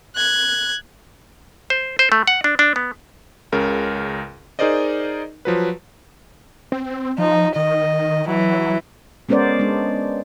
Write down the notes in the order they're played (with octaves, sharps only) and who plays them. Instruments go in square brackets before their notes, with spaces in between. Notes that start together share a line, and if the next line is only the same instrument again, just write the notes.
[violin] F#6 G#6
[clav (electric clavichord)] C5
C5
A3
F#5
D4
D4
B3
[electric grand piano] C#2 C#3 A#4
D#4 G#4 A#4 C5 D5 D#5
F3 F#3 B4
[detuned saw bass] C4
[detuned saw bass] F3 [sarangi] D#4
[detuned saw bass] D#3 [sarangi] D#5
[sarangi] E3 [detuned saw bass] F#3
[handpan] G#3 B3 C#4 A#4 C5 D5
G#3 D4